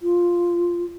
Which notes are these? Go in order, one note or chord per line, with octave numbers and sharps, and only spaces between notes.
F4